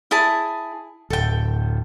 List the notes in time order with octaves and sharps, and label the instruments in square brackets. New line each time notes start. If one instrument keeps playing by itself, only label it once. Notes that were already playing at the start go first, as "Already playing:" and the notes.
[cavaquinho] E4 G#4 A5
[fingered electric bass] D1 [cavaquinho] A4 G5